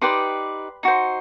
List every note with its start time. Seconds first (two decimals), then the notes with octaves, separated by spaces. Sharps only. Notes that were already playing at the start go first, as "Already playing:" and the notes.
0.01 D#4 G4 B4 D5 C6
0.83 D#4 F#4 C5